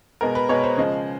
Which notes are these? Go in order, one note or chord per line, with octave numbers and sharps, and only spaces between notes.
B2 G#3 B3 A#4
B4
B2 G#3 B3 C#5
C5
C#3 F3 G#3